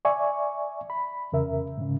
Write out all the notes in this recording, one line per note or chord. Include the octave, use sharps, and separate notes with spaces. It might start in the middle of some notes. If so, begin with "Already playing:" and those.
D5 E5 G#5 C#6
B5
E2 C#3 A#4 E5
G#2 C#3